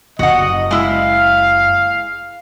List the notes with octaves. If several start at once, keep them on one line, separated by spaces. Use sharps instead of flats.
F#1 F#4 D#5 F#5
G#3 E4 F5